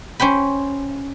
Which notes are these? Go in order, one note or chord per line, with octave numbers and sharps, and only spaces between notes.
C#4 C5 G5 B5